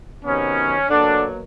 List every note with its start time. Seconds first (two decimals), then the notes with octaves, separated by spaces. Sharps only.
0.24 C3 D#3 F#3 B3 C#4
0.90 B2 D3 F#3 A#3 D4